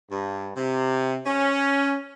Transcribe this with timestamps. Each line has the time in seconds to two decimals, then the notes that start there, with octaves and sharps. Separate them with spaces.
0.11 G2
0.56 C3
1.26 C#4